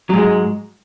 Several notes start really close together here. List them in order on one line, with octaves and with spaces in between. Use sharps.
F#3 G#2 G#3